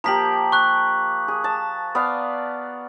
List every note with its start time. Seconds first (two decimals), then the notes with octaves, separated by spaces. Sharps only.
0.04 F3 A#3 G4 A#5 B6 F#7
0.52 C#6 F#6
1.28 G#4
1.44 A5
1.95 B3 D5 F5